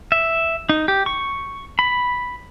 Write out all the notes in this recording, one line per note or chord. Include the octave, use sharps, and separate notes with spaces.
E5
D#4
G4
C#6
B5